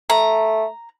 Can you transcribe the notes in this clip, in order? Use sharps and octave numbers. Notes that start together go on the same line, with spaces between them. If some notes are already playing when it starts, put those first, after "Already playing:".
A3 A#5